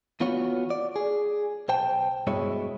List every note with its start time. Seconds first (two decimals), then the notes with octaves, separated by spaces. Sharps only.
0.20 E3 B3 F4 F#4 C#5
0.70 D5
0.96 G#4
1.68 B1 C5 G5 A5
2.27 G2 B2 G#3 E4 C#5